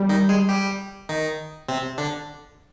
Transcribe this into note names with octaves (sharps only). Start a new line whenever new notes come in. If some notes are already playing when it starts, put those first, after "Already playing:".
Already playing: G3
D#3 D#4
G#3 G#4
G3 G4
D#3 D#4
C3 C4
D3 D4